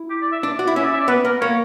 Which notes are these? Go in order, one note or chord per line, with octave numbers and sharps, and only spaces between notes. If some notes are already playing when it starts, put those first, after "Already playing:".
Already playing: E4
G4
D5
E5
D4 D5
F#4 D5
E4
C#4 E5
D5
E5
D5
B3 B4
B3 A#4
A#3 C#5